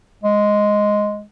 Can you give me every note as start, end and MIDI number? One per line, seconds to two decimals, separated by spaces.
0.24 1.22 56